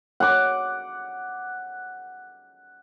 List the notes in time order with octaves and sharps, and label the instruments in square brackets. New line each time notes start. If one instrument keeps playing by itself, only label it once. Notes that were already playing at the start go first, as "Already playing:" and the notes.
[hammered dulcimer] F#5 D6